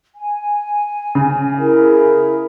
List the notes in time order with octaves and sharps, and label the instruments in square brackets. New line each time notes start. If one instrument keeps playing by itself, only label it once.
[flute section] G#5
[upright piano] C#3
[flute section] E4 G#4 A#4